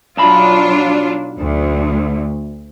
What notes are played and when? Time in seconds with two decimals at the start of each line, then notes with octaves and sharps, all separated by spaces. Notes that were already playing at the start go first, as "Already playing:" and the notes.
0.17 B1 F#3 D4 F4 A5 B5
1.38 D2